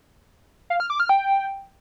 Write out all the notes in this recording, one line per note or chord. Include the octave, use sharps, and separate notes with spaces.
F5
F6
D6
F6
G5